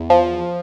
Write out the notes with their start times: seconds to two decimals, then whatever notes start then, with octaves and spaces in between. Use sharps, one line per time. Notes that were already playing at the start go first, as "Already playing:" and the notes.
Already playing: E2
0.10 F3